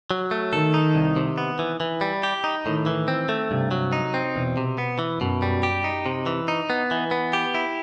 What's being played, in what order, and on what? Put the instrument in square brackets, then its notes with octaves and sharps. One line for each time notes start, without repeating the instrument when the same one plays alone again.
[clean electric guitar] F#3
A3
[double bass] D#3 [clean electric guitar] A4
[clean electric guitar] D#4
C2
C3
B3
E3
E3
G3
G4
D#4
[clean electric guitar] A2 [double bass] D#3
[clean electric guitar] E3
C4
A3
[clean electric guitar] G2 [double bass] C3
[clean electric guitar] F#3
D#4
C4
[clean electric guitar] E2 [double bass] B2
[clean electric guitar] C3
B3
E3
[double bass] F#2 [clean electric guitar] B2
[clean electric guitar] G3
G4
D#4
C3
E3
D#4
B3
E3
B3
G4
E4